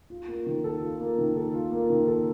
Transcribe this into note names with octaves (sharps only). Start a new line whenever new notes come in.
F4
A#3
D#3
A4
F4
A#3
D#3
A4
F4
A#3
D#3
A4